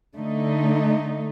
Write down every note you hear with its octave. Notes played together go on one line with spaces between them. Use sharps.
D3 A3 D#4